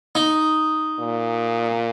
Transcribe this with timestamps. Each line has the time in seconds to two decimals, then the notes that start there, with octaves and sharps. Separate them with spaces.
0.15 D#4
0.99 A#2